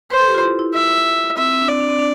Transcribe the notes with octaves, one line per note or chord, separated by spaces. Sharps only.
B4 C5
A4
G4
F4
E4
E4
E5
C4 E5
C4
D4
C4 D5
D4
C4
D4